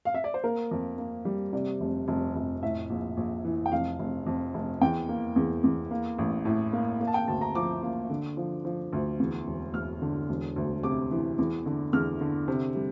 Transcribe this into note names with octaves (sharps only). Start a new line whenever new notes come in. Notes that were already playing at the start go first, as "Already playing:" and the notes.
F5
E5
D5
C5
A#3 A#4
F2
A#3
G3
C3 D5
F1
F1
F1
A2 E5
A#1
A#1
E3
G5
F1 F5
F1
F2
F1
E2 G5
A#3
E2
E2
A#3
A1
A2
A#3
A#3
A5
G5
D2 A5
A#5
F3 D6
A#3
D3
F3
F3
D2
E2
E1
E1 F6
D3
E1
D2
C3 D6
E3
E2
D3
E2 F6
D3
C3
G3